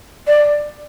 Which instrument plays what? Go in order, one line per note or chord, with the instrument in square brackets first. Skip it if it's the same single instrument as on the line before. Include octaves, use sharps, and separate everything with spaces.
[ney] D5